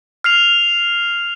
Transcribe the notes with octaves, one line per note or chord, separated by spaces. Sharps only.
F6 C7 F7